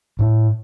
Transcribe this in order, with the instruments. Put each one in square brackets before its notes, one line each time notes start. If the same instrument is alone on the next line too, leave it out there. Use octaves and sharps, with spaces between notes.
[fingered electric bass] A2